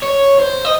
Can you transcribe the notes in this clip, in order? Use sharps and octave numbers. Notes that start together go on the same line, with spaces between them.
C#5
C5
D#5